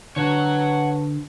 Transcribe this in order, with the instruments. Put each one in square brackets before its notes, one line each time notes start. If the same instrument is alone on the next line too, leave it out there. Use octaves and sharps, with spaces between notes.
[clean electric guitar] D3 [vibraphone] B4 A5 C#6 [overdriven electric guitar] C#5 F#5